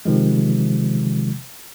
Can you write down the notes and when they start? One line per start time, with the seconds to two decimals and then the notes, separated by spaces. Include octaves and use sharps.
0.05 C3 D#3 F3 G#3